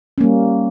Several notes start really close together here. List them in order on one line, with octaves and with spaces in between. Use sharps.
C#4 A#3 G3